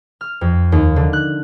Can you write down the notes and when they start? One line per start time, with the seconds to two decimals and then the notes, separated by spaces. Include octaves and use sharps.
0.21 F6
0.41 F2
0.72 D#2
0.96 D3
1.13 F#6